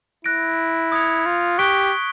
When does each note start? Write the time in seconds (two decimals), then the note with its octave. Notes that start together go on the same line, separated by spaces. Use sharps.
0.24 E4 F#6 A#6 D7
0.92 D#6 G#6 C#7 F7
1.26 F4
1.59 G4 C#6 F#6 B6 D7 G7